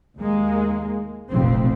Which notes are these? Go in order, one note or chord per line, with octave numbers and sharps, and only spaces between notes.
D#2 G#3 A#3
F1 A#1 F2 B2 C4